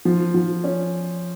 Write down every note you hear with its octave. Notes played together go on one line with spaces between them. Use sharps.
F3
F3
C#4